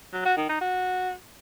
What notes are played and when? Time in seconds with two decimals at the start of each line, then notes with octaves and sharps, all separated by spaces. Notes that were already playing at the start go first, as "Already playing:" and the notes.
0.13 F#3
0.25 F#4
0.37 D#3
0.49 D#4
0.61 F#4